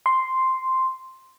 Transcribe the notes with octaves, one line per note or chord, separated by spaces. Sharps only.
C6